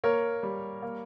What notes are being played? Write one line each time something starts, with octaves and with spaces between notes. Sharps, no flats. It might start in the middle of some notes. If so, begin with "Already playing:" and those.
A#3 A#4 C#5
G3
A#3